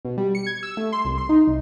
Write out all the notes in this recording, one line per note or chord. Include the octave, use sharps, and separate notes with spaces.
B2
G3
C#7
G#6
E6
A3
C6
C2
C6
D#4
C2